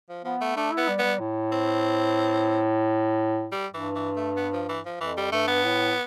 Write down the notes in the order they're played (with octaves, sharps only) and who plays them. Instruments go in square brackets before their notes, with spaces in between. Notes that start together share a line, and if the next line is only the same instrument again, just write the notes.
[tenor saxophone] F3
[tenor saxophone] F3 [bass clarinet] B3
[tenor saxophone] A3
[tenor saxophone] A3 [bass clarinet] D4
[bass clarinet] E4
[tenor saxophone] B3
[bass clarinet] G3
[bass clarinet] G3 [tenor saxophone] B3
[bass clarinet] A2
[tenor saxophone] C4
G3
[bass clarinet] G2 [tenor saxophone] E3
[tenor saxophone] E3
A3
B3
F3
E3
F3
[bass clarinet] F2 [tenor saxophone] E3
[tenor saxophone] G3
[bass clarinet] G2 [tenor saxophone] A3
[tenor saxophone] B3
[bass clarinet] A2